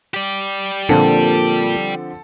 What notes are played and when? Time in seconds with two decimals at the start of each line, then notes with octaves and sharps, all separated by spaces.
0.14 G4 D5
0.89 A#2 D3 F3 C4 A4